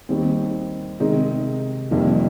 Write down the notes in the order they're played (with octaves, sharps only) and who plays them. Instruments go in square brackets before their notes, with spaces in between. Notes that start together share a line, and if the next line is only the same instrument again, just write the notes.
[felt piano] D#2 D#3 G3 C4
C3 D#3 G#3 D#4
F1 F2 D#3 G3 A#3